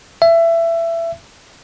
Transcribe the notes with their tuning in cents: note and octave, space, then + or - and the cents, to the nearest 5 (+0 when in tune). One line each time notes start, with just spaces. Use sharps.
E5 +20